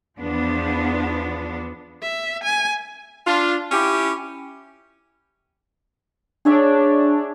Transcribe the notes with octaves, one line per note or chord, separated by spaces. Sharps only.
E2 F3 B3 D4
E5
G#5
D4 F4
C#4 E4 G4
D4 G#4 C#5 E5